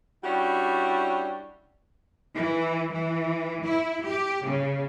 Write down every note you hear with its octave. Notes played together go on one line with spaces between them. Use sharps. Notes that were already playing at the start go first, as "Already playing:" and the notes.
G3 C#4 D4 E4 F#4
E3
E3
E4
G4
C#3